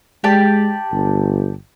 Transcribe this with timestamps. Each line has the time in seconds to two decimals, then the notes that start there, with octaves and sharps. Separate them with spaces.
0.24 G#3 G4 D5 A5
0.92 G1